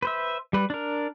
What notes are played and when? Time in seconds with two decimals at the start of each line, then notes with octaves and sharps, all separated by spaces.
0.02 B4 C5 E5
0.53 G3 B4
0.70 D4 A#4